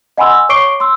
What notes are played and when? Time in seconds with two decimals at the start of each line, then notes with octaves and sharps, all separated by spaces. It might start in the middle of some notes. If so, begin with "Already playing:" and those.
0.17 D#5 F#5 G#5 B5 C6 E6
0.49 C#5 C#6 D6 C7 D7 G7
0.80 C6 E6